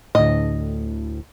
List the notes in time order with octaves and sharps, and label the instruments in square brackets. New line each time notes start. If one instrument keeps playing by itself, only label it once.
[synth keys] D2 A2 [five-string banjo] D#5